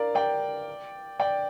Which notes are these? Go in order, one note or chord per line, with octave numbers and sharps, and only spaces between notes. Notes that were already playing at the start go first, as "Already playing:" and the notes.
Already playing: A#4 D5 F5
D5 G5
D5 G5